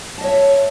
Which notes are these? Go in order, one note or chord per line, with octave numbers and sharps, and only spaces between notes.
C#5 D#5 E5 A5